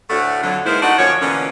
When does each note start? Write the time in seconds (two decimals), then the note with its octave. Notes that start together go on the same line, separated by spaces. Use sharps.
0.10 D2 A2 D3 A3 F#4 F#5
0.43 F2 D3 F#3
0.66 G#2 G#3 A#3 B3 E4 C5
0.82 A3 D4 D#4 F#4 F#5
0.98 F#2 D3 F3 C#5
1.21 B2 D3 E3 A#3 C#4